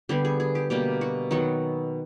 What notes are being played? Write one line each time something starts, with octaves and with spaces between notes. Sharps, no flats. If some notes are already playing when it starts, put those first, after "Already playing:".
D3 G3 B3 G4
G#4
G#4
G4
B2 G3 A#3 G4
F#4
D#3 F#3 B3 F#4